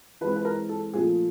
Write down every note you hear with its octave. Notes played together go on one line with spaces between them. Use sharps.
E3 G#3 C4 B4
B4
A#4
A4
A#2 F3 A3 C4 G#4